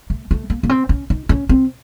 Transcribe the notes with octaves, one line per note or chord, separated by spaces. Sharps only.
A3
A3
A#3
A#3
C4
C#4
D#4
C#4
C4